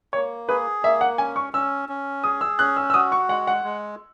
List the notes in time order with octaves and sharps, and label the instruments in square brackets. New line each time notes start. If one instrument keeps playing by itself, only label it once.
[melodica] A#3 [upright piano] C#5
[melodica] G#4 [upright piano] B4
[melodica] A#3 [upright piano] E5
[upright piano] F#5
[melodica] C#4 [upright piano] G#5
[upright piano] C#6
[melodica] C#4 [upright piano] E6
[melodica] C#4
[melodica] G#4 [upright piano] D#6
[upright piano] E6
[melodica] C#4 [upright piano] F#6
[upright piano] E6
E6
[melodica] F#4 [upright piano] D#6
[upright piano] C#6
[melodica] G#3 [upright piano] F#5
[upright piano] F#5
[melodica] G#3